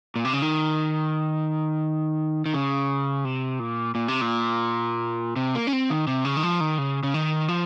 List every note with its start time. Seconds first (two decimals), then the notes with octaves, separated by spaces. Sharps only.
0.16 A#2
0.25 C3
0.33 C#3
0.42 D#3
2.46 D#3
2.54 C#3
3.25 C3
3.59 A#2
3.95 A#2
4.08 C3
4.21 A#2
5.36 C3
5.55 A#3
5.67 C#4
5.73 C4
5.90 D#3
6.07 C3
6.25 C#3
6.37 D#3
6.43 F3
6.60 D#3
6.78 C#3
7.03 C#3
7.14 D#3
7.48 F3